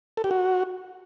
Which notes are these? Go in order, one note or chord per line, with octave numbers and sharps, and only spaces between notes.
A4
G4
F#4